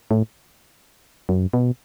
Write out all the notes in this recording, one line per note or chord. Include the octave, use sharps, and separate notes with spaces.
A2
F#2
B2